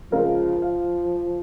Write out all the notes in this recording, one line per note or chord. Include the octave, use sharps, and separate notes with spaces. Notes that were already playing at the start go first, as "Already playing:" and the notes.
C#3 F3 G#3 F4 A#4 F5
F5